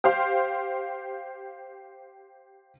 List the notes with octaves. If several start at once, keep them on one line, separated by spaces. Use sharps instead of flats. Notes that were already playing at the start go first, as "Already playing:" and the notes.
G4 C5 F5